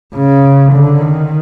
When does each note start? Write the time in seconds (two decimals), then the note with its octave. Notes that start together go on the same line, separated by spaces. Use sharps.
0.15 C#3
0.73 D3
1.01 D#3